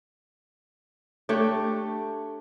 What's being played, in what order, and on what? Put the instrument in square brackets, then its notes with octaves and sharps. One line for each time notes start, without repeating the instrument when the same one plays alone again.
[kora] A3 D4 G4 C#5